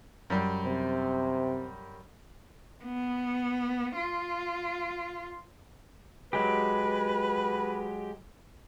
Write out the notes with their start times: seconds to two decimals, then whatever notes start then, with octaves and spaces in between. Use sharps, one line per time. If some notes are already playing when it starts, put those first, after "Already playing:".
0.30 F#2 G3
0.65 C3
2.84 B3
3.97 F4
6.33 F#3 G#3 G4 B4